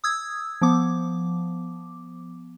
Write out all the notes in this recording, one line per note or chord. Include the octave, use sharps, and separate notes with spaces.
D#6 E6 G#6
F3 B3 D6